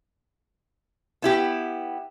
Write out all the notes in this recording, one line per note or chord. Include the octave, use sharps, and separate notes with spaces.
B3 E4 G4